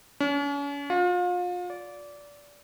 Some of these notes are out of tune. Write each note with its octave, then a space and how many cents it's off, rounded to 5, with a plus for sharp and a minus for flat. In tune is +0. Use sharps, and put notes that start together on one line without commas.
C#4 +40
F4 +35
D5 -20